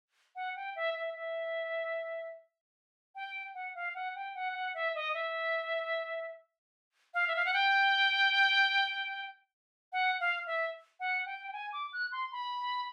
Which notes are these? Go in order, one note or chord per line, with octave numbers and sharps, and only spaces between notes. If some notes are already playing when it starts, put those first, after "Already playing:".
F#5
G5
E5
E5
E5
G5
F#5
F5
F#5
G5
F#5
F#5
E5
D#5
E5
F5
E5
F5
F#5
G5
F#5
F5
E5
F#5
G5
G5
G#5
D6
F#6
C6
B5